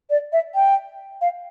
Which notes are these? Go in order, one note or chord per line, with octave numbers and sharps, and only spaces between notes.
D5
E5
G5
F5